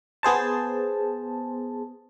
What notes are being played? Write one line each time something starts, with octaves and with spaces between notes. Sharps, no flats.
B3 G#4 C5 A5